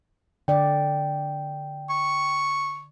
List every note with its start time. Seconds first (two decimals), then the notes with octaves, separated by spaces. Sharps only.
0.48 D3 D5 G5
1.90 C#6